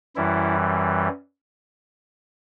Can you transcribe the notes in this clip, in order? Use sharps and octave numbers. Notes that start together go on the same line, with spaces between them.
F#2 E3 G3 E4